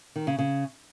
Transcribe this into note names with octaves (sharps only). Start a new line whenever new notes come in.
D#3
C#3
C#3